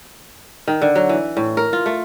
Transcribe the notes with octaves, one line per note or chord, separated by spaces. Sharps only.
D#3
D3
F#3
E3
A2
A#4
F4
A3